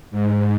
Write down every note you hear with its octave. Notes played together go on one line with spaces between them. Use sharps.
G#2